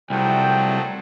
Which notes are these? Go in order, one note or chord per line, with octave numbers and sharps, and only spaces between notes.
C2 F3 F#3 A3 G5